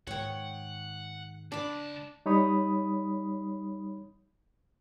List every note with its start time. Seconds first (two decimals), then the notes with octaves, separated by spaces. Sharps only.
0.07 G#2 D#3 C#5 F#5 G5
1.52 C#2 D4 A5 B5
2.26 G3 D#4 C#5 B5 D#6